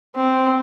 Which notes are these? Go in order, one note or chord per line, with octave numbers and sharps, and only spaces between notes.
C4